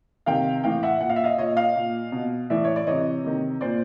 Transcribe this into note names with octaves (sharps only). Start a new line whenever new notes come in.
C3 D#3 F5 G5
A2 E3 F5 G5
E5 F#5
A#2 F#5
F5
E5
D#5 F5
A#2 C#5 D#5
D#5 F5
A#2
B2
A2 E3 D5 E5
C#5
D5
C3 E3 C#5 D#5
C3 D#3
A#2 C5 D5